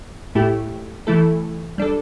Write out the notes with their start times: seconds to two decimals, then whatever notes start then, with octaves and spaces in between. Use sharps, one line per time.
0.35 A2 A3 E4 G4
1.07 E3 A3 E4 A4
1.78 G3 D4 A4